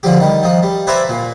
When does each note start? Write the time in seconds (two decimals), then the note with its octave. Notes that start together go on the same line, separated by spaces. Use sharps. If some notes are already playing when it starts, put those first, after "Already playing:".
0.03 D3 F3 G4
0.20 D#3 G3
0.43 F3 D#4
0.63 G3
0.87 B4 C5 D5 E5 G#5 A#5
1.09 A#2